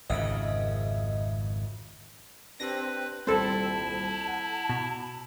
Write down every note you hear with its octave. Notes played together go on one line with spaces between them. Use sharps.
G#1 F2 C#3 D#5 E5
C4 D4 G4 B4 A#6
D#1 C2 G3 C4 E4 A4 A5
F#5
B2